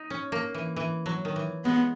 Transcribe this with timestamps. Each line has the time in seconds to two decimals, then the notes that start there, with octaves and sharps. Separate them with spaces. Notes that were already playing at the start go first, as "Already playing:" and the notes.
Already playing: D#4
0.10 C#4
0.32 A#3
0.54 E3
0.76 E3
1.06 F#3
1.25 D#3
1.36 E3
1.65 G#3 B3